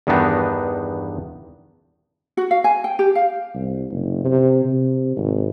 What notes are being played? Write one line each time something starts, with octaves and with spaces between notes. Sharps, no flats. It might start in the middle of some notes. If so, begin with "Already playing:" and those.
E2 G2 D#3 B3 D4 D#4
F#4
F5
G#5
G5
G4
F5
C2
F#1
C3
C3
G#1